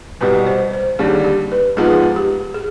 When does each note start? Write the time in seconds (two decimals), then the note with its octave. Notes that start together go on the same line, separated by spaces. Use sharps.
0.21 C2 B2 G3 B4
0.47 C5
0.73 C5
0.99 D#2 D3 G3 D4 G#4
1.25 G4
1.52 B4
1.77 G#2 F3 G#3 B3 G#4
2.16 G4
2.54 G#4